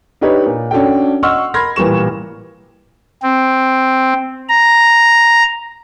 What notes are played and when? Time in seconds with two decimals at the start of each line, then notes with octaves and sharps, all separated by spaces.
0.21 D4 D#4 G4 B4 C#5
0.46 A#2
0.71 C#4 D4 F#4 A4 G5
1.23 D#5 F#5 C6 C#6 E6 F6
1.54 A#4 B5 C6 F6 G#6 A#6
1.76 A1 A#2 G3 B4 C#6 E7
3.23 C4
4.49 A#5